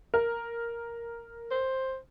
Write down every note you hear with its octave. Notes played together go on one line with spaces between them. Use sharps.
A#4
C5